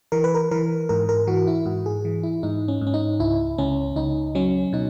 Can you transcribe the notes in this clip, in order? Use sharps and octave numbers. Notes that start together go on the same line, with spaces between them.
E3 A#4
B4
A#4
E3 A#4
G#2 A#4
A#4
E3 F#4
E4
G#2 F#4
G#4
E3
E4
G#2 D#4
C#4
G#2
C#4
D#4
C#2 E4
C#2 C#4
C#2 D#4
F#3 C#4
B2 D#4